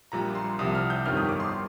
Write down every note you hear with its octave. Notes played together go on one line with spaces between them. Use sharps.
A#1 A#2 G3 A#5
C6
C2 C3 F3 D#6
F6
G6
G1 F2 D#3 G3 F6
D#6
D6
C6